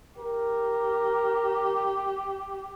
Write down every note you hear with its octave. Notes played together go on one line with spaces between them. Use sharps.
G4 A#4